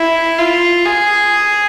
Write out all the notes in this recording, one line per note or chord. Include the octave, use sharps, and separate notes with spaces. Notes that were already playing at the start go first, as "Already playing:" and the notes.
Already playing: E4
F4
G#4